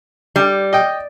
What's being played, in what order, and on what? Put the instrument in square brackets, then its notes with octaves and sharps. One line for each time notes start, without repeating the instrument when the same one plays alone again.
[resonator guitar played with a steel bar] G3
[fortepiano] D#5 G5